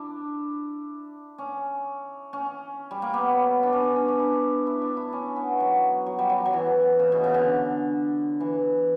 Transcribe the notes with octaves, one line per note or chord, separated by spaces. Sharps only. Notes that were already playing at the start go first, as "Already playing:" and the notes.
Already playing: D4 E4
C#4
C#4
G3
A#3
B3
D4
C#4
D4
C#4
D4
E4
E4
D4
E4
C#4
B3
F#3
F#3
G3
F#3
F#3
E3
C#3
B2
C#3
D3
E3